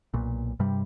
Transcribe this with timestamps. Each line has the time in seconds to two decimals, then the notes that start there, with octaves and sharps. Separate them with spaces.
0.14 B1 A#2
0.60 G2 C3 G3